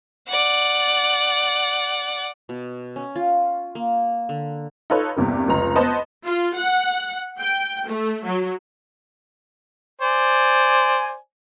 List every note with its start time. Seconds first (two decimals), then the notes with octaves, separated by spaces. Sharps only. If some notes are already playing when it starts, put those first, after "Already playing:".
0.29 D5 F#5
2.49 B2
2.96 C#4
3.16 F4
3.75 A#3
4.29 D3
4.90 D#4 F4 A4 B4 C#5
5.16 E2 G2 C3 A#3
5.48 F1 C#2 A#5
5.76 B3 B4 C5 D#5 A5
6.24 F4
6.57 F#5
7.40 G5
7.88 A3
8.25 F#3
10.02 C5 D5 G#5